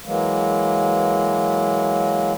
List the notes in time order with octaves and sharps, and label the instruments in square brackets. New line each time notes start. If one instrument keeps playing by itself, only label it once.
[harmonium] E3 F#3 G#3 A#3